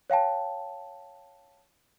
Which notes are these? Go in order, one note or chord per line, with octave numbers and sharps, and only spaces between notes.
C#5 F5 G5 A5